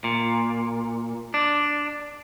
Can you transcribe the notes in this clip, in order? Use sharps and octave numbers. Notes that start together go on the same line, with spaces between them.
A#2
D4